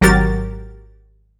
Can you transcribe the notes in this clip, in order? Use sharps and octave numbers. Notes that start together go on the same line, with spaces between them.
G#1 F#3 F#4 G4 A#4 A6